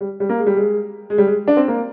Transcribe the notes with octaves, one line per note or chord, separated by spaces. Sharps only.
G3
G3
A#3
G#3
G3
G#3
G#3
G3
G#3
D4
C4
A#3